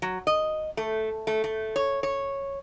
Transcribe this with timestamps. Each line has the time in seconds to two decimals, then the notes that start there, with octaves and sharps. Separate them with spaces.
0.02 F#3
0.27 D#5
0.77 A3
1.27 A3
1.44 A3
1.76 C#5
2.03 C#5